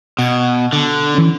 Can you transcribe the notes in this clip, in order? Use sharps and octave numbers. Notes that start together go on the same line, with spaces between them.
B2 F#5 G#6
D3
E3 C#4